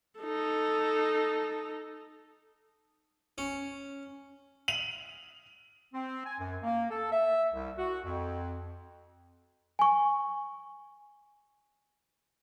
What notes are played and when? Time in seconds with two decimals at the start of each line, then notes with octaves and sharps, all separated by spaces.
0.20 D#4 A4
3.38 C#4
4.68 D#7 F7 F#7
5.93 C4
6.25 G#5
6.39 F#2
6.62 A#3
6.89 A4
7.11 E5
7.52 C2
7.77 F#4
8.05 F2
9.79 G#5 C#6